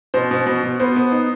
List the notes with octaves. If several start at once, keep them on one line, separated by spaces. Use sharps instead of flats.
B2 C5
B2
B2
B2
B3 C5
B3
D#4